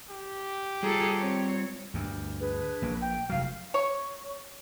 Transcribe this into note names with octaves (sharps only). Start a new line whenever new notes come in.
G4
G3 F4 G#4 A4 A#5
C4 C#5
D2 G2
D4 G#4 B4
A#1 A#3
G5
F1 F#3 F5
C#5